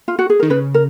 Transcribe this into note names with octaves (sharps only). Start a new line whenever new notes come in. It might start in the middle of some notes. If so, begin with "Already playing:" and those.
F4
F#4
G#4
D#3 A#4
C#3 B4
A#4